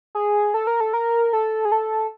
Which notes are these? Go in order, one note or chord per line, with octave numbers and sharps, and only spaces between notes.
G#4
A4
A#4
A4
A#4
A4
G#4
A4